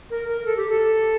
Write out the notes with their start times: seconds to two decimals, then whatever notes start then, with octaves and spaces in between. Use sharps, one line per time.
0.10 A#4
0.28 A#4
0.45 A4
0.57 G4
0.69 A4